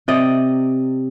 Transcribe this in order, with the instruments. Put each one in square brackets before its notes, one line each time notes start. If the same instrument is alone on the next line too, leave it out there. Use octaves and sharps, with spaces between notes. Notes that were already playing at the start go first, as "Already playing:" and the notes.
[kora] C3 D5 D#5